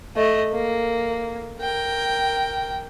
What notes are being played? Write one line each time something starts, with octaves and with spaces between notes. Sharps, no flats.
A3 D#5
A#3
A#4 G5